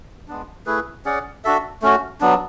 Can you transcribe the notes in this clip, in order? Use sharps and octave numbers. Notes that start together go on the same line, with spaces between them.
G#3 B3 D4
A3 E4 G#4 B4
C#4 G#4 D5 F#5
D4 F#4 A4 E5
A3 C#4 F#4
F#3 B3 D4